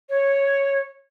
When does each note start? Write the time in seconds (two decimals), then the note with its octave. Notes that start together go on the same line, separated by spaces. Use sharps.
0.09 C#5